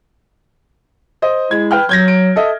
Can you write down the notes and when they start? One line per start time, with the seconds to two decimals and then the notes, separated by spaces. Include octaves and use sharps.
1.22 C5 D#5
1.51 G#3 E4 G#6
1.71 B4 G5 F6
1.89 F#3 G6 G#6 A#6
2.08 D7
2.36 A4 D#5 E5